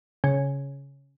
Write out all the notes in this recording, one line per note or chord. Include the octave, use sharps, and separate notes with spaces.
C#3